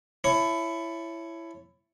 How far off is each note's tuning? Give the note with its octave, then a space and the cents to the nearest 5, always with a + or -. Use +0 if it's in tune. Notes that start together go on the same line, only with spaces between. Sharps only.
E4 +15 C#5 +0 A5 +0